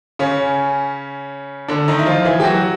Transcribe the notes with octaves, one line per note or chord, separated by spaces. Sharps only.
C#3 C#4
D3 D4
D#3 D#4
E4
F3 F4
E3 E4
G4
F#3 F#4